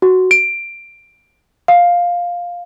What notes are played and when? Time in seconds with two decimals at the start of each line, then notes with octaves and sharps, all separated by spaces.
0.02 F#4
0.31 D7
1.68 F5